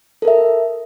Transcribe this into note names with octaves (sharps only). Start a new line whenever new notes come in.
A4 A#4 E5